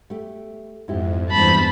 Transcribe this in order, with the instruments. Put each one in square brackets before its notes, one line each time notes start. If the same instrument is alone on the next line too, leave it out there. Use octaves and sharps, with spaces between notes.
[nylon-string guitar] A3 G4
[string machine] F2 [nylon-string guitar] G#2 E4 G4
[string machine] E2 G2 C5 [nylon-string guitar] G3 G#3 [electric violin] A5 B5